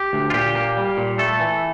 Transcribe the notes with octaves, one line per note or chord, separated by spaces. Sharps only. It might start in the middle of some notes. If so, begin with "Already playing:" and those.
Already playing: G4
D2
F4
A#2 G4
A#3
G3
A#2
A3 A4
E3